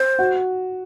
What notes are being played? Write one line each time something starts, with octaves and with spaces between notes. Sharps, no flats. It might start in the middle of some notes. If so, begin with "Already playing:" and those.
Already playing: C5
F#4